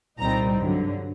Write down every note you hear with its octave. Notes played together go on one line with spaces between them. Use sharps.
C2 A#2 G3 C4 D#4 A#5
G2 D3 F#3